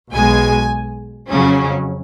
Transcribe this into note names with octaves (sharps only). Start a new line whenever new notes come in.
B1 B2 G#3 G#5
F2 C#3 F#3 C#4